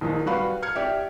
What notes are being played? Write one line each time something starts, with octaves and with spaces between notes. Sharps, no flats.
A#1 D#3 F3
G3 F#4 B4 F5
F6 G#6 C#7
G4 D5 E5